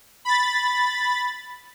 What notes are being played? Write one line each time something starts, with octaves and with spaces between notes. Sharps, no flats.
B5 A6